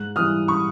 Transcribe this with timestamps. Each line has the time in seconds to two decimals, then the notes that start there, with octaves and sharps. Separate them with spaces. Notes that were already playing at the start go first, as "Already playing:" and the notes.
Already playing: G#2 F#6
0.16 E3 G3 D#6 F6
0.48 B5 C#6